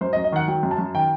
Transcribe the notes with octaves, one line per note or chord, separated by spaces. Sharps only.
F#2 C5
D#5
F#2
D#5
D#3 F#5
F#3 G5
F#2
A5
F#2
D#3 G5